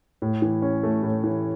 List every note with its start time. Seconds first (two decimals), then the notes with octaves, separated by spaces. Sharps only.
0.22 A2
0.42 E3
0.62 C#4
0.83 A3
1.03 A2
1.24 E3